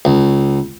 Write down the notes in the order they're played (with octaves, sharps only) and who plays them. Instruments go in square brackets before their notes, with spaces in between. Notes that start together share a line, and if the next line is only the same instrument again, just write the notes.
[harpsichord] C#2